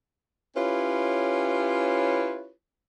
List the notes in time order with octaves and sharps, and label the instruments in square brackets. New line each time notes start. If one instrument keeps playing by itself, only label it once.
[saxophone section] C#4 E4 F4 G4 B4 C#5